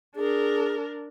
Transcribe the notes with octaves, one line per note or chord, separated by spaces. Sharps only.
D4 G#4 A#4